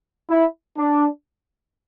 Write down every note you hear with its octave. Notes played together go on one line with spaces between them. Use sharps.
E4
D4